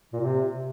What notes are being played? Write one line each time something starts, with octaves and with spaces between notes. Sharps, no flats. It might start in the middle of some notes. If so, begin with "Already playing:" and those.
A#2
C3